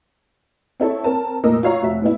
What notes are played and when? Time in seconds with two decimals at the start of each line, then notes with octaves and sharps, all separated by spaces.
0.80 C4 E4 A4 C#5
1.04 C4 A#4 A5
1.44 F1 A#2 A#4 D#5 E6
1.63 F4 F#4 C#5 F5 A#5
1.82 F1 F#4 E5
2.02 A2 B3 E4